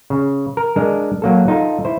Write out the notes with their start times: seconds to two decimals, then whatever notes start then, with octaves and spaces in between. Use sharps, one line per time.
0.10 C#3
0.57 A#4
0.76 G#3 D4 A#4
1.22 F#3 A#3 A4
1.48 D#4 F4 A4
1.85 E4 C5